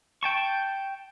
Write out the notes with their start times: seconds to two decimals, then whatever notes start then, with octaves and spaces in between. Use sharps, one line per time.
0.23 G5 A5 C#6